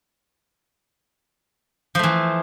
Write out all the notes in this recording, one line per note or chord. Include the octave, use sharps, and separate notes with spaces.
E3 F3 A3